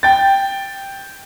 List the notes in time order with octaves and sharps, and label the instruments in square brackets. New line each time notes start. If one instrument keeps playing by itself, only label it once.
[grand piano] G5 A6